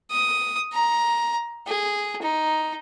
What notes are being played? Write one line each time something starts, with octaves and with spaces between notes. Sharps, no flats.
D#6
A#5
G#4
D#4